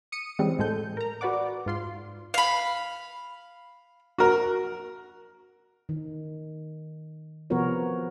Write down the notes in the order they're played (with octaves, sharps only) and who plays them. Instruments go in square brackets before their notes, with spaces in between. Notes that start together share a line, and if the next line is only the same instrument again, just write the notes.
[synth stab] D#6 C#7 D#7
C#3 E3 G3 G#3 C4
A2 G#3 A4 G6
A#4 A#5
F#4 B4 D5 F#5 D6
G#2 F4 C6
[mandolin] F5 B5
[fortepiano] F#4 A#4
[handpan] D#3
C3 F3 B3 F#4 A#4 C#5